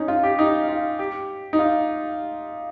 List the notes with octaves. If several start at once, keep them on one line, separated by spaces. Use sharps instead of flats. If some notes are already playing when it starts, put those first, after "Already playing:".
Already playing: C#4 D#4
F4
G4
D#4
F4
G4
D#4
F4